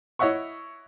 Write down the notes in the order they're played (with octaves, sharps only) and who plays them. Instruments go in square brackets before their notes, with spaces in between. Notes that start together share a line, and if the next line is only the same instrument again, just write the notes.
[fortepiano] E4 C#5 D#5 E5 F#5 C#6